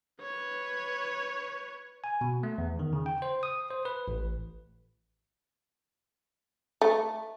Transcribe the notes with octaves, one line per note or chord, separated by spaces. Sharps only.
B4 C#5
G#5
B2
A3
E2
D#3
C#3
G5
C5
D#6
C5
B4
A1
A3